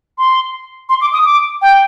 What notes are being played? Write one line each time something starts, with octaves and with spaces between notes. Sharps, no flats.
C6
C6
D6
D#6
D6
G5